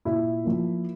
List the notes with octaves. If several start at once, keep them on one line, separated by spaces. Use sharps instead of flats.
A#2 E4 E5
F3 A#3